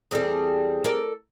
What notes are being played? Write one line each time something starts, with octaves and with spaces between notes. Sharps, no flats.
E2 G3 C4 G#4 A4
A4 A#4 D5